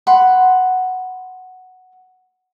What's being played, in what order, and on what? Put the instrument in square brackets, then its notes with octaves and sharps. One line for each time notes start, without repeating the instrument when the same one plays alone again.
[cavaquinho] F#5 B5 C6